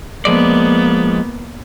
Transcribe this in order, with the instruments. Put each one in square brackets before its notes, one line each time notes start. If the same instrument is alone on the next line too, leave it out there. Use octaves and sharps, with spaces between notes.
[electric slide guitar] F3 G#3 D5 [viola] A#3 B3